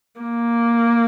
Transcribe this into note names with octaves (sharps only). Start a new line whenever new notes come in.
A#3